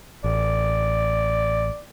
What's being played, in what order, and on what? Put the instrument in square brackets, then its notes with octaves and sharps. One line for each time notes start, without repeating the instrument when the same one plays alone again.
[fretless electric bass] A1 [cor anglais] D5